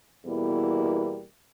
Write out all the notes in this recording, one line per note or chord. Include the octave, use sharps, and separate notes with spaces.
E2 B2 G3 A#3 E4